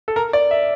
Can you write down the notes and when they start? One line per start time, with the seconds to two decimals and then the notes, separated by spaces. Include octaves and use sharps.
0.08 A4
0.16 A#4
0.33 D5
0.51 E5